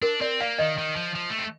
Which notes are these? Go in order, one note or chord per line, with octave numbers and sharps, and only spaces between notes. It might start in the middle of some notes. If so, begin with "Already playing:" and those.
D4 A#4
C4 D5
A#3 F5
D#3 D#5
D#3
F3
F3
A3
C4